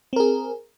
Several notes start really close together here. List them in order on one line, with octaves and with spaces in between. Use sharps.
C4 A#4 G#4